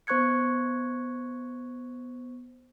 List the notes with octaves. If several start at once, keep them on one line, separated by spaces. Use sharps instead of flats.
B3 C5 C#6 F#6 G#6 C#7